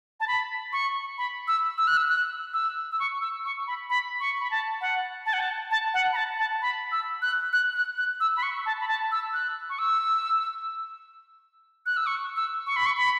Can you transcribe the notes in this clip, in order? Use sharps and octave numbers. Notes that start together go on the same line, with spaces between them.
A5
B5
C#6
B5
E6
E6
F#6
E6
F#6
E6
E6
C#6
E6
C#6
B5
B5
C#6
B5
A5
F#5
A5
F#5
A5
A5
F#5
B5
A5
A5
B5
E6
F#6
F#6
F#6
F#6
E6
B5
C#6
A5
B5
A5
E6
F#6
C#6
E6
F#6
E6
C#6
E6
C#6
B5
C#6
B5